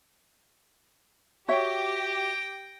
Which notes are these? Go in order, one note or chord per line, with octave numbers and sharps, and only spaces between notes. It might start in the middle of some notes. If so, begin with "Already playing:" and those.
F#4 G4 C#5 E5 G5 A#6